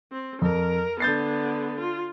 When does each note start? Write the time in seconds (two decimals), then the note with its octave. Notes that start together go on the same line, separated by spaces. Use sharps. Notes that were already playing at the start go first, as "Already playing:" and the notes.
0.11 C4
0.42 F2 A#4
1.00 D3 B3 G6 A6 C7
1.80 F4